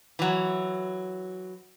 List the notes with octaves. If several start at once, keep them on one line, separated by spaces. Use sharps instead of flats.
E3 F#3